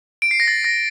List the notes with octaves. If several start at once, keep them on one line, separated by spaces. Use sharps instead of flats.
D7
C7
A#6
A6
A#6